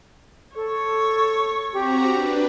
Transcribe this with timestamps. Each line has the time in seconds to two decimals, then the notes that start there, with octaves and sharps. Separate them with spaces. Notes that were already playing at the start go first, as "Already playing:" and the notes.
0.56 A4 C#5
1.73 C4 F#4 G4 A#5
2.08 D4 B4